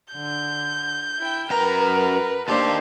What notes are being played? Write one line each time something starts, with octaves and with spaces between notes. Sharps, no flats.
D3 G6
E4 G5
F#2 A#4 B4 A#5
D#2 A#3 D4 G4 A4 C5